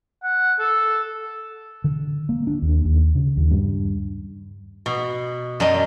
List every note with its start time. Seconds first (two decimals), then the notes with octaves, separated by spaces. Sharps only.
0.23 F#5
0.59 A4
1.84 D3
2.29 A#3
2.47 D4
2.62 D#2
2.85 D#2
3.15 C#3
3.37 D#2
3.51 G2
4.86 B2
5.60 F#2 A4 D5 D#5